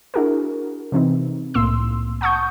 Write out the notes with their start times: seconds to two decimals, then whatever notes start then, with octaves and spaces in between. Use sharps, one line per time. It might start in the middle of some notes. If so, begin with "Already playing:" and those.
0.14 D4 E4 F#4 G#4 A#4
0.92 C3 E3 C4 D#4
1.54 C2 A2 A#3 C6 E6
2.21 F#5 A5 C#6 D#6 G6